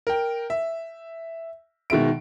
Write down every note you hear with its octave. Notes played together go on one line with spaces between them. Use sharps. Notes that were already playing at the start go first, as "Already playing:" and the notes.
A#4 G5
E5
B2 D#3 G#3 E5 D7